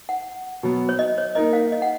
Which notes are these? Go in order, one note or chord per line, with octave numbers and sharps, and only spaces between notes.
F#5
B2 F#3 B3
C#5
D#5
C#5
A#3 D#4 A#4 D#5
F5
D#5
F#5